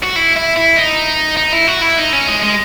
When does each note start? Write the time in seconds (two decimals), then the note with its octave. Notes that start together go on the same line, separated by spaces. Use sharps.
0.03 F#4
0.16 E4
0.36 E4
0.56 E4
0.76 D#4
1.37 D#4
1.53 E4
1.68 F#4
1.82 E4
1.98 D#4
2.13 C#4
2.28 G#3
2.43 G#3